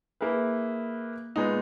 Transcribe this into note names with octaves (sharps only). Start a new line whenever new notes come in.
A#3 E4 G#4 B4
A#2 G#3 B3 D#4